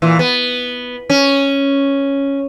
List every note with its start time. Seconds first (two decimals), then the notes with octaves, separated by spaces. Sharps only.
0.02 A#2 E3
0.19 B3
1.10 C#4